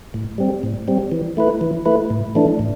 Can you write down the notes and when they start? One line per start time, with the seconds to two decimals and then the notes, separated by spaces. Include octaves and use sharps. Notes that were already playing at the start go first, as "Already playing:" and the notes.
0.14 A2
0.38 G3 C4
0.63 A2
0.88 G3 C4
1.12 E3
1.37 A3 E4 B4
1.61 E3
1.85 A3 E4 B4
2.10 A2
2.35 E3 A3 D4
2.59 A2